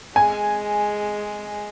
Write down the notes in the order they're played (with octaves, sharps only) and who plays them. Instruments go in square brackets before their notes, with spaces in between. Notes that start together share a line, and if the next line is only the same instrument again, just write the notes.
[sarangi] G#3 [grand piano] G#5